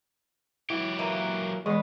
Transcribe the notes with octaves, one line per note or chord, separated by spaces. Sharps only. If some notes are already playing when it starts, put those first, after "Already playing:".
E3 F#3 E4 G4
E3 A#3
E3 G#3 B3 D#5